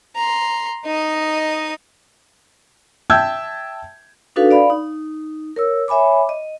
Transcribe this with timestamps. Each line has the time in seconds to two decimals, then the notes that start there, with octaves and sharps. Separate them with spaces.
0.16 A#5 C6
0.85 D#4 D#5
3.10 E5 G5 A5 E6 G6 G#6
4.36 D4 D#4 F#4 A4 B4 F5
4.51 D5 F5 B5
4.70 D#4
5.56 A#4 C#5 E6
5.88 C#5 E5 G#5 B5 D6
6.29 D#5